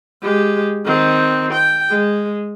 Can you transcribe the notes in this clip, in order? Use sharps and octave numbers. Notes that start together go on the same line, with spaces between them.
G#3 G4
D#3 C4
G5
G#3